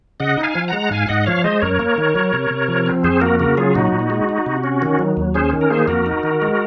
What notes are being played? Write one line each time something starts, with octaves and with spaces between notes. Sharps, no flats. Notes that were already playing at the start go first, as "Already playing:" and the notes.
C#3 D#5 F#5
D#4
F5 G#5
F3
G#3 F#5 A#5
G#2 F5 G#5
G#2 D#5 F#5
F3 C#5 F5
G#3 C5 D#5
F#2 A#4 C#5
A#3
D#3
F#3
C3
C3
F3
C4
F2 G#4 C5
A#3 F#4 A#4
C#3 F#4 A#4
F#3 F4 G#4
A#2 D#4 F#4
A#2
G#3
D#4
C3
C#4
D#3
F#3
D#2
C#4 G#4 C5
D#3
A#4
A#3 G#4 C5
F2 F#4 A#4
D#4
D#3
G#3